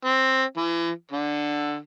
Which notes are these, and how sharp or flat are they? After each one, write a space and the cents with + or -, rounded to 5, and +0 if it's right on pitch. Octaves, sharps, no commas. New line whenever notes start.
C4 +10
E3 +35
D3 +5